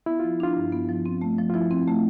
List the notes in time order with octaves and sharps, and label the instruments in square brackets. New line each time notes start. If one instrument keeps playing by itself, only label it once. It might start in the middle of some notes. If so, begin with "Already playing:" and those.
[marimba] B3 [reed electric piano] E4
[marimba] F3 [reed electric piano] F4
[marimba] D4 [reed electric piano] F4
[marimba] G2
B3
F3
C4
A3
F3
[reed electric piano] F4
[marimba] F3 [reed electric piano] E4
[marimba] C4
A3